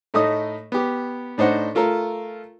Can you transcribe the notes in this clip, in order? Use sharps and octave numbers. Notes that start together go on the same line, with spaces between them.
A2 A3 D#4 D#5 D#6
B3 G4
A2 D4 D#4 C5 F#5
A3 F4 A4 A#4